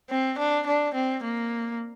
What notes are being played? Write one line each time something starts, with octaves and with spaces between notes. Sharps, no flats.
C4
D4
D4
C4
A#3